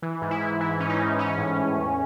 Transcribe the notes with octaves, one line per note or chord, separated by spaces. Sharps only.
E3
G#2
E4
G#2
E3 E4
G#2 C#4
D#4
G#2
E3 C#4
A2
A2
E2